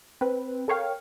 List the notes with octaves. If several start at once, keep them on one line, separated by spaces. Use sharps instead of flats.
C4 B4
A4 A#4 C#5 F5 G5